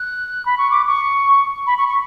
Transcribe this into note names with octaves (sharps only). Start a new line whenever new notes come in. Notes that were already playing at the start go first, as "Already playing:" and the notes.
Already playing: F#6
B5
C#6
D6
C#6
B5
C#6
C#6